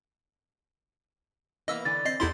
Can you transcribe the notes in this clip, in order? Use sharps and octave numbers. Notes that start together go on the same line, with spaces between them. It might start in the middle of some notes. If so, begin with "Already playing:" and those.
E3 A#3 B3 D#5 E6
D3 E3 A6
C4 D#5 C7
E2 D#4 E4 G4 A4 C6